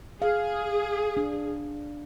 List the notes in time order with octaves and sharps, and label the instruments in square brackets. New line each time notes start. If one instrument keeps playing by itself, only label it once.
[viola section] G#4 [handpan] F5
[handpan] D4